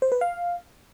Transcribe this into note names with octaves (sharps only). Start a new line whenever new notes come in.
C5
B4
F5